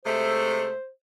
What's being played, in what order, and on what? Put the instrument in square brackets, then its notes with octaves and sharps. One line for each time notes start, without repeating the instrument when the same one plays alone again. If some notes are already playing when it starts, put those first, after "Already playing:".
[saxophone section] C3 G#3 A3 [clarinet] C5